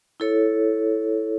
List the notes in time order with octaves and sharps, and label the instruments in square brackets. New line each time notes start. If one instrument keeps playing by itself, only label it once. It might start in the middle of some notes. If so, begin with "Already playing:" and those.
[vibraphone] E4 A4 C#5